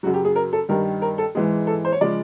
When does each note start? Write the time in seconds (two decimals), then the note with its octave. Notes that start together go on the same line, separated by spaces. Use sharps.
0.03 F#2 C#3 F#3 F#4
0.14 G4
0.25 G#4
0.36 A#4
0.53 A4
0.68 G2 D#3 G3 A#4
1.02 A#4
1.18 A4
1.35 G#2 E3 G#3 G#4
1.67 A4
1.85 C5
1.92 C#5
2.01 C#3 F3 G#3 D5